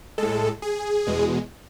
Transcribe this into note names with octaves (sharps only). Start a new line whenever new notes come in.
A2 G#3 A4
G#4
E2 B2 G#3